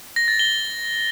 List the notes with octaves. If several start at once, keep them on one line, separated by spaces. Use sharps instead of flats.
A#6
A6
G7